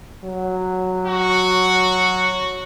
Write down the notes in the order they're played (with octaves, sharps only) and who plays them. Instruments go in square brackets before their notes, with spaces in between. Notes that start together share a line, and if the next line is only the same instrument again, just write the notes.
[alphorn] F#3
[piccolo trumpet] F#4